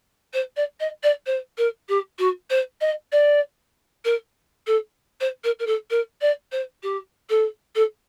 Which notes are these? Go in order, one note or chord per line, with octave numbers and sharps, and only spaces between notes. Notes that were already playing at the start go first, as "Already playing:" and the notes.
C5
D5
D#5
D5
C5
A#4
G4
F#4
C5
D#5
D5
A#4
A4
C5
A#4
A#4
A4
A#4
D5
C5
G4
A4
A4